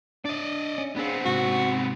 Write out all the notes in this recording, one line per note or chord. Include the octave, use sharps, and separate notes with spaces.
D4 D5 D#5
C#4
B3 C4 D4 G#4 F5
G#2 C3 F#4